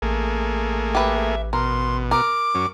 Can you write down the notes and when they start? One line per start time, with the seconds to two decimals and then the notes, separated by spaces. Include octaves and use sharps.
0.02 A1 A3 A#3 G#4
0.95 G4 B4 E5
1.53 B2 A#4 C6
2.11 A#4 D6
2.55 F#2 C#4